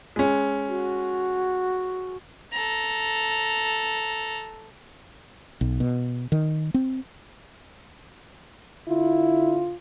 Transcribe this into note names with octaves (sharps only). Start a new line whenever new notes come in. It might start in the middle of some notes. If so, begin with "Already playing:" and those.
G#3 C#4
F#4
A4 A#5
B1
B2
D#3
C4
D3 E4 F4